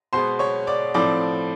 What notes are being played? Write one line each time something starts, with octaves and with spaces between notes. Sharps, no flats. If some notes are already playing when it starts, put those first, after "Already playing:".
B2 G#3 B3 C5 C6
C#5 C#6
D5 D6
A2 F3 A3 C4 D5 D6